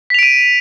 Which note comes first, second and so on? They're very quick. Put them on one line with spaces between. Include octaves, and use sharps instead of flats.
B6 F7 D7 D#7